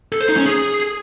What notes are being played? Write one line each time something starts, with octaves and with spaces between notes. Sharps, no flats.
A4
C5
D#4
C#4
G#4